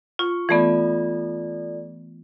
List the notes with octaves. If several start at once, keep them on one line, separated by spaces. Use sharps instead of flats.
F4 C#6
E3 A3 B3 F4 A4 D5